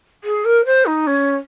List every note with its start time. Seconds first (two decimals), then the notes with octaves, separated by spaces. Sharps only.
0.24 G#4
0.45 A#4
0.65 C5
0.86 D#4
1.07 C#4